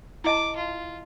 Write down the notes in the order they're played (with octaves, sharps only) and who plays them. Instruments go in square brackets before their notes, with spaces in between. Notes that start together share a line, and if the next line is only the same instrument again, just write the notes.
[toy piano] E4 D#5 A5 [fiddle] D6
[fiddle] F4